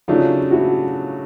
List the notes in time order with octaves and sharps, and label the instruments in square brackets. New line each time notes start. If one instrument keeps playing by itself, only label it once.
[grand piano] C#3 F#3 A3 D4 [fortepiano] D#4 F4
[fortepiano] E4 F#4